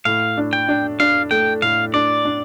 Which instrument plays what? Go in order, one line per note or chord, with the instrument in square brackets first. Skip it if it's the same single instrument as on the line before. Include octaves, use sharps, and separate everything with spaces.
[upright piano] A2 [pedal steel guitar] F5
[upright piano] D4
[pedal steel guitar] G5
[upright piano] D4
[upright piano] D4 [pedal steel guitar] F5
[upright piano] A3 [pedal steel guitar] G5
[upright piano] A2 [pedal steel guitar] F5
[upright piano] D4 [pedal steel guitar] D5
[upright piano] D4